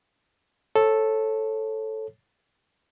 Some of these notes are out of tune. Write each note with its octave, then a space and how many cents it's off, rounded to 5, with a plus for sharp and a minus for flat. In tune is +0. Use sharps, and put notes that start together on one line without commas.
A4 +0 C#5 -25